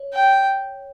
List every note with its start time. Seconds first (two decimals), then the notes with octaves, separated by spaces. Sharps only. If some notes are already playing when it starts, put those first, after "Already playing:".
Already playing: C#5
0.13 G5